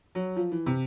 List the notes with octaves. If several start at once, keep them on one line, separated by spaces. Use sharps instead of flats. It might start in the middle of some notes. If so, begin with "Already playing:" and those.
F#3
F3
E3
C3